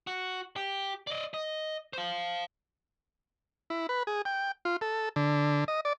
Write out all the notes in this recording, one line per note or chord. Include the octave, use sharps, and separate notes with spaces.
F#4
G4
D5 D#5
D#5
C5 F5
E4
B4
G#4
G5
F4
A4
D3
D#5
D5